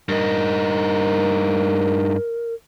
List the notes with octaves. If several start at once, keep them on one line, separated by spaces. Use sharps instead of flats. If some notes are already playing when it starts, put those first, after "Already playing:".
G2 D#4 A#4